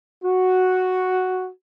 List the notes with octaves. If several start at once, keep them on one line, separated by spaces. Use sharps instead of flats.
F#4